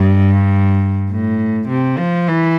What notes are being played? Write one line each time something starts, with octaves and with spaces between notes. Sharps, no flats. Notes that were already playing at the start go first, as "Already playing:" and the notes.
Already playing: G2
A2
C3
F3
E3